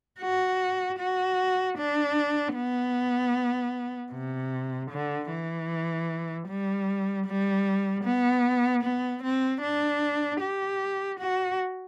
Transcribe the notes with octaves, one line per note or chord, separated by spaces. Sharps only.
F#4
F#4
D4
B3
C3
D3
E3
G3
G3
B3
B3
C4
D4
G4
F#4